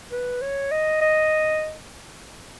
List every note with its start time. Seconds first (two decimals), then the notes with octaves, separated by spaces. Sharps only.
0.12 B4
0.41 C#5
0.71 D#5
1.01 D#5